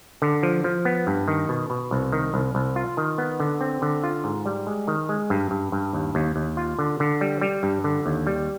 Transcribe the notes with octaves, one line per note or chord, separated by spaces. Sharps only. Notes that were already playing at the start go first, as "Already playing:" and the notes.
D3
F3
F3
B3
G2
D#3
B2
B2
C2
D#3
C2
C2
F4
D#3
B3
D3
C4
D3
F4
G#2
G3
G#3
D#3
G#3
G2
G2
G2
D#2
D#2
D#2
F4
D3
D3
G3
G3
G2
D3
D#2
G3